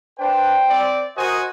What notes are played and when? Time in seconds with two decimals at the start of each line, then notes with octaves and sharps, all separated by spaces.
0.19 D4 B4 C5 G5
0.69 C4 D5
1.17 F#4 A#4 C5 D#5 G#5